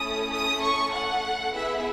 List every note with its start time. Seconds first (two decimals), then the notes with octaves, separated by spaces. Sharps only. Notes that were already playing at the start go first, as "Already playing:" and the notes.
Already playing: A3 C#4 E4 A4 D#6
0.32 D#6
0.62 C#6
0.93 F#5
1.52 B3 E4 G#4 E5